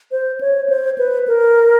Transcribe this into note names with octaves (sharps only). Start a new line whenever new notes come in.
C5
C#5
C5
B4
A#4